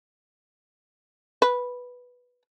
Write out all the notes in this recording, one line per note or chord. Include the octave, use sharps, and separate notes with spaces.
B4